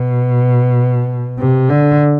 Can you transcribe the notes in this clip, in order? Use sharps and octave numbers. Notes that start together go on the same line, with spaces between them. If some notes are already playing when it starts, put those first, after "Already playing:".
Already playing: B2
C3
D3